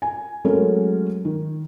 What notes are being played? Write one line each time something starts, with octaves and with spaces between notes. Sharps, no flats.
G#5
F#3 G#3 A3 C#4 A4 A#4
D#3